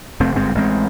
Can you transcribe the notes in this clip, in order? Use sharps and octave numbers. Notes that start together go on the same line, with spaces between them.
F1 F2 A3 C4
G1 G#2 G#3 C4
A1 G#3 C4